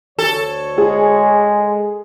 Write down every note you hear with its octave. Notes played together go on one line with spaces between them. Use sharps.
D2 A4 C#5
G#3 G#4